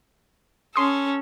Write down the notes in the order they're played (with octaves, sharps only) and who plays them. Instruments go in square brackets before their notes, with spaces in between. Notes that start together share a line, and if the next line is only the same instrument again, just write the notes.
[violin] C#4 A4 [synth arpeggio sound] C6 D#6